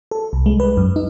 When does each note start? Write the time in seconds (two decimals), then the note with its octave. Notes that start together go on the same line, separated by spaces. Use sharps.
0.11 A4
0.33 C2
0.46 G#3
0.60 B4
0.77 F#2
0.96 D#4